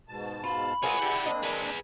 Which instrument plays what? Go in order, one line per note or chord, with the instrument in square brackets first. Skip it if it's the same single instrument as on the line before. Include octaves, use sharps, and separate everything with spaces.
[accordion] G#2 B2 A5
[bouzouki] F4 [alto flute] B5
[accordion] C4 F4 A#4 [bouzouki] F#4 G#4 B4 [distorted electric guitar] C#5 D#5
[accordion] E4 G4 [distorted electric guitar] D5 F#5
[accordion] A#3 C4 D4 [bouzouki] D#5
[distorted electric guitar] G#4 B4